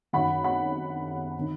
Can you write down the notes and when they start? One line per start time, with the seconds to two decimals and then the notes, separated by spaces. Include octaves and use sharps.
0.13 F#2 D#3 F#5 B5
0.44 F#5 B5
1.39 D#3